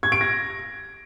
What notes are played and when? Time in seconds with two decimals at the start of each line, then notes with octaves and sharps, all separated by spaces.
0.03 G#6
0.12 D7
0.21 A#6